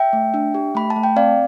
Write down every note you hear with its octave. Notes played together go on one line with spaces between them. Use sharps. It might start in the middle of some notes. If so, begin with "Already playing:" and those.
Already playing: E5 G5
A3
D4
G4
A3 B5
A5
A3
G5
C4 D5 F5